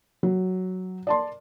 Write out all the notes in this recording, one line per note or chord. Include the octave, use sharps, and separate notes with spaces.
F#3
D5 A5 C6